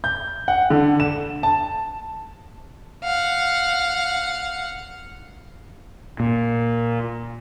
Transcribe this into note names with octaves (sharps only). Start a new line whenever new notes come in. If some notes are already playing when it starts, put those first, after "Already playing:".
G6
F#5
D3
E7
A5
F5 F#5
A#2